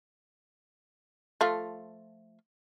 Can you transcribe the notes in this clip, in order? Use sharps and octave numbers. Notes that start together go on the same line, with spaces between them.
F3 A3 F4